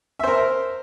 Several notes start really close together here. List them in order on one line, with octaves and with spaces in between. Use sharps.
E5 C5 A#4